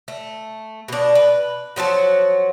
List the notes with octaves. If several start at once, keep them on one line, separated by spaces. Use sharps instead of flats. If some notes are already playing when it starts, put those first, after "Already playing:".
A3
B2 D4
B4
F3 F#3 F#4 A5